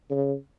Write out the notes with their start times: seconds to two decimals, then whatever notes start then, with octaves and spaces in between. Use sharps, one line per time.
0.11 C#3